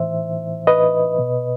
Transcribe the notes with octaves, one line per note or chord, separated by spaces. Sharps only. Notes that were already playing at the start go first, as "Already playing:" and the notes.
Already playing: A2 E3 C5 E5
B4 D#5
B2